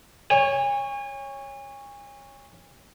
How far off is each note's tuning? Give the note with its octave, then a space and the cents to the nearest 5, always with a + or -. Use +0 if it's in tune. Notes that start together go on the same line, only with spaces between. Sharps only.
C#5 +0 G#5 -35